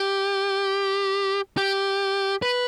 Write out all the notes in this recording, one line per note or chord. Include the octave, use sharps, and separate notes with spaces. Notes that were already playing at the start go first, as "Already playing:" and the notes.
Already playing: G4
G4
B4